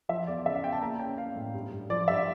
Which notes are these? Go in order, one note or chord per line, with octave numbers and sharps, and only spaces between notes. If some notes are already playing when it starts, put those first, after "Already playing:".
F3 E5
E2 D5
C#3 E5
F5
E2 G5
A5
A#3 A#5
C#4 G5
C#4 F5
A2
G2
G2
F3 D5
G2 E5